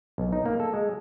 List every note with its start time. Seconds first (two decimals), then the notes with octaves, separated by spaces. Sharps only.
0.18 B1
0.32 D#4
0.46 A#3
0.60 A4
0.74 G#3